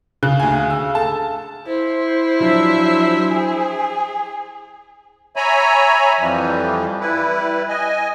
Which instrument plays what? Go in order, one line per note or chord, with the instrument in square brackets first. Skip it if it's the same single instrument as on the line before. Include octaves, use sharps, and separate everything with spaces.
[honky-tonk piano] C#3 [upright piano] F#6
[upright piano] D2 G#5
E6
A4 A5
[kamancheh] E4 [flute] C5
[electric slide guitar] F3 F#3 D4 [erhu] E5
[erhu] G#4 [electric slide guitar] G#5
[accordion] C#5 E5 G#5 A#5 B5
F2 E3 F3 G3
G3 E4 B4
D#5 G#5